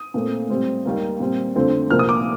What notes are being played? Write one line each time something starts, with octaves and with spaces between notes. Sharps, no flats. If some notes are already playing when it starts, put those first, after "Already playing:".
Already playing: D#6
A#2 A3 C4
A2 G3 C4
D#2 D#3 G3 A#3
A#2 G3 C4
F2 D3 A3 C4
C2 A#2 F3 A#3 F6
D#6
D6